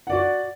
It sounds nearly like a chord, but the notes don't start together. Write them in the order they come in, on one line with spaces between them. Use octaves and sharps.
F#5 D5 F#4